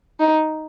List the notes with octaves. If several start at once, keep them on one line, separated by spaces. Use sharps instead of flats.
D#4